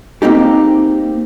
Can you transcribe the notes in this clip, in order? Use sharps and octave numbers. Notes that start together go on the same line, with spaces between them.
A#3 C4 D#4 G4